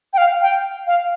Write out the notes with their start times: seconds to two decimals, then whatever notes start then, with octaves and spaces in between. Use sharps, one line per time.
0.13 G5
0.18 F5
0.41 G5
0.87 F5